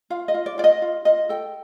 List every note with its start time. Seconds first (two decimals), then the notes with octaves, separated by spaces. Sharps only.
0.10 F4 F5
0.28 D#5
0.34 F4
0.46 D5
0.58 F4 D5
0.64 D#5
0.82 F4
1.05 F4 D#5
1.29 A4 G5